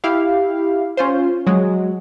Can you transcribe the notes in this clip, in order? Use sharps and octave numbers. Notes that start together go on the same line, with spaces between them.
E4 G4 F5
C#4 F4 C5
F#3 G#3